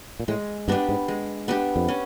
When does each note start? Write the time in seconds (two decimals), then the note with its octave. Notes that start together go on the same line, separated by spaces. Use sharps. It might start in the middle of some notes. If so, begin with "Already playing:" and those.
0.20 A#2
0.28 A2 G#3
0.68 G2 B3 D4 G4
0.89 G#2
1.08 G#3
1.48 B3 D4 G4
1.76 F2
1.88 C#4